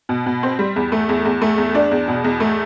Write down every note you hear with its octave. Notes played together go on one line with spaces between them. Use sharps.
B2
B2
C4
G3
E2
A3
E2
E2
A3
E2
D4
E2
B2
E2
A3